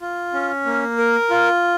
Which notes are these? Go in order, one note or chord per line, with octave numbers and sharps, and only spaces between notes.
F4
C#4
A#3
A#4
F4